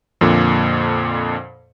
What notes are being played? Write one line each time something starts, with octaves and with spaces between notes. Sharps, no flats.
F2 A#2 D3